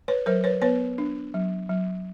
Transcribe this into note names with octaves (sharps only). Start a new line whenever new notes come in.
B4 C#5
F#3 A#4 C5
B4 C#5
B3 B4 C#5
D4
F#3
F#3